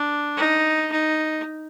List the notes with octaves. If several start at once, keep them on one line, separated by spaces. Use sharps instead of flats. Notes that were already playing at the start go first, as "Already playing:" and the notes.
Already playing: D4
D#4
D#4